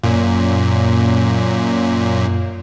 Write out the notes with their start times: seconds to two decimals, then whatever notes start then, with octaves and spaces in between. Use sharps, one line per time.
0.03 F#2 A#2